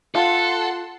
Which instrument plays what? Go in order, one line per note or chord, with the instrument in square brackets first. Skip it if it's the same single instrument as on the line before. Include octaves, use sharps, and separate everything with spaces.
[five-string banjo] F4 [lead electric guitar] A4 [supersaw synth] F#5 A5 C6